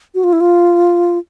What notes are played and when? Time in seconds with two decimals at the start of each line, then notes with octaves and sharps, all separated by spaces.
0.15 F#4
0.24 F4
0.33 E4
0.40 F4